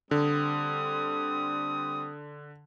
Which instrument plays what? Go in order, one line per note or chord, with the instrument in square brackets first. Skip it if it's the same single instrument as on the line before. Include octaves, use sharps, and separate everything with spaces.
[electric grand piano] D3 [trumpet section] G3 C4 D#6